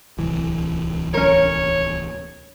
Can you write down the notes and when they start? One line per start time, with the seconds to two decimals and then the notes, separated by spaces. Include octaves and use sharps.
0.18 D1 C2 E3
1.14 C#4 A#4 C#5